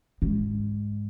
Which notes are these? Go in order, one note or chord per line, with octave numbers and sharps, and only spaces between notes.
G#2